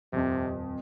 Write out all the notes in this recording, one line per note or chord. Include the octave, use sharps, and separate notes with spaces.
D#1 F2 C3